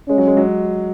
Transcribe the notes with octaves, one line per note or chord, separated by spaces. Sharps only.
G#3 C#4
F#3
G#3
F#3